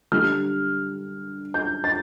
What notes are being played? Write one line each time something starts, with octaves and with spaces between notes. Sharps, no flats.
D3 G3 F6
G6
A6